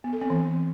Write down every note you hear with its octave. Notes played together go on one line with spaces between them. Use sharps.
B3
A4
C4
E3